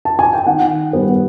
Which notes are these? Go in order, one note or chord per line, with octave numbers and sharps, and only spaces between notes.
A5
G#5
G5
D#3 F#5
G3 B3